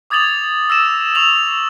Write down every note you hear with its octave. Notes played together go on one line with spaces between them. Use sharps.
D6 D#6 G#6 A6 F7 F#7
E6 A#6 E7
C#6 E6 F7 F#7